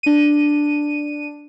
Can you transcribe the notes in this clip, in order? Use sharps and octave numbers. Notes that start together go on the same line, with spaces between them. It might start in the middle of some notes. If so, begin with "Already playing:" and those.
D4 D#7